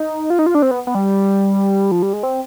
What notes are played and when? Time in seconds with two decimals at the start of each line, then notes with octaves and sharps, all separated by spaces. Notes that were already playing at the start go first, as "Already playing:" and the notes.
Already playing: D#4
0.30 F4
0.39 D#4
0.46 F4
0.55 D4
0.62 C4
0.71 B3
0.87 B3
0.95 G3
1.91 F3
2.02 G3
2.13 G#3
2.23 C4